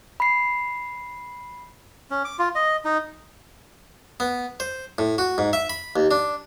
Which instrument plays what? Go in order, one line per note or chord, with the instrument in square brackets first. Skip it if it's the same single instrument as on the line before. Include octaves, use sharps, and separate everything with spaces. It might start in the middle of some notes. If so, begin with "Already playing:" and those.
[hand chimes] B5 C7
[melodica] C#4
D6
F4
D#5
D#4
[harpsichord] B3
C5
A2
F#4
G#2
E5
B5
D#2
D4